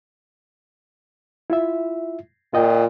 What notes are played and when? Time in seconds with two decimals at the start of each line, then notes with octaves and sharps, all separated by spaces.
1.50 E4 F4 E5
2.54 A#2 F4 D#5 G5